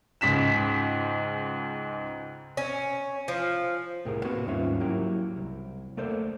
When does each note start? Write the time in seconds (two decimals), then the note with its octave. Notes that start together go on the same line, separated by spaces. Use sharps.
0.21 C#2 G#2 B6 E7
2.57 C#4
3.28 F3
4.05 C2 A2 G4 G#4 A#4
4.24 A#3 C4 F#4 B4 C#5
4.47 D#2 G#2 G3 C#4 F4 E5
4.80 F#3 A#3 E4 G4
5.36 C2
5.97 A3 A#3 A4 C5 D5